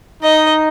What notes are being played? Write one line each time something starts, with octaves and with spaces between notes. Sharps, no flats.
D#4 D#5